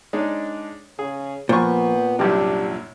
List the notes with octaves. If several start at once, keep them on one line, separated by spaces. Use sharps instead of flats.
G#3 D4 D#4 C#5
C#3 G#4
A#2 F3 B3 B4 C5 C#6
C2 F#2 C3 G3 D4 G4